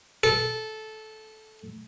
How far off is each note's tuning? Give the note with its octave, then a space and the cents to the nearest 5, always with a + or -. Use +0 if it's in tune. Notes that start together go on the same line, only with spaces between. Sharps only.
A4 -15